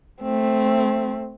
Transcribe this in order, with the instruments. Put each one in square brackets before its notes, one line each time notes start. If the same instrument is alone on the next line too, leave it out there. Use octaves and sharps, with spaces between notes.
[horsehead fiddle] A3 C4